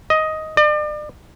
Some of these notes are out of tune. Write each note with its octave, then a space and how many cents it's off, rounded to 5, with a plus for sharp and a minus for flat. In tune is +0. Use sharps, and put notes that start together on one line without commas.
D#5 +10
D5 +40